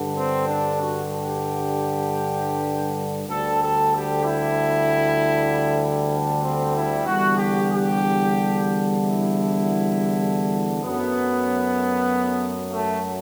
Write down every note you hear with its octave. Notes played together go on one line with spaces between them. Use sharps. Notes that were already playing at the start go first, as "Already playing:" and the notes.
Already playing: G2 D3 G3
C4
D4
F#4
G4
D2 D3 G3 A4
A4
G4
E4
D4
C4
E4
E2 D3 G3 F#4
G4
G4
E4
F#2 F#3 A3 B3
A3